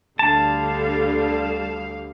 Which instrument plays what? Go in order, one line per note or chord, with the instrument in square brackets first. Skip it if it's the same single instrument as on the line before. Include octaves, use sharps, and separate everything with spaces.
[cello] D2 F5 [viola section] D3 G3 [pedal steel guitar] A5